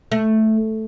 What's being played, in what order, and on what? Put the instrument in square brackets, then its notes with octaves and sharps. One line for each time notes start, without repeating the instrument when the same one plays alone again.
[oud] A3